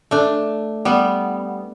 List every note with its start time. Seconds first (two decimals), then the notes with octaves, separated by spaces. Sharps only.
0.11 A3 D4
0.85 G3 B3